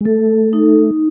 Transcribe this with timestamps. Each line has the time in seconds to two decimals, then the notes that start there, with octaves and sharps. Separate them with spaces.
0.01 G#3
0.05 A3 A4
0.53 D#4